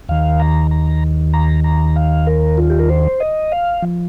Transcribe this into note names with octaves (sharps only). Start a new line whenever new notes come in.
D#2 D#3 F5
A#5
A#5
A#5
A#5
F5
A#4
F4
G4
A#4
C5
D#5
F5
F3